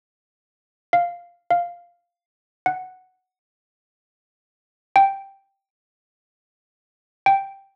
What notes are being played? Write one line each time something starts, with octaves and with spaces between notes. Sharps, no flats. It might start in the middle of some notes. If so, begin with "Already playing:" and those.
F5
F5
F#5
G5
G5